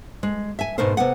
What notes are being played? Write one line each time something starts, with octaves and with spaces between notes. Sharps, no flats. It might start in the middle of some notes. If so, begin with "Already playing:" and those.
G#3
E5 G#5
G#2 B2 A3 D#4 A#4 C5
C3 B3 F#5